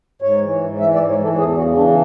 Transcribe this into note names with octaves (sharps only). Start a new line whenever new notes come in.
G#2 C#5
E3
G#2
E3 E5
D5
G#2
C#5
E3 A4
E2 G#4
C#3 F#4
E3 D4